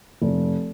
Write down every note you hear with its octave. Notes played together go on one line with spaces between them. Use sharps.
F1